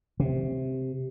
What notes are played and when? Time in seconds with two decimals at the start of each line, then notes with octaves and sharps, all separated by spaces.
0.20 C3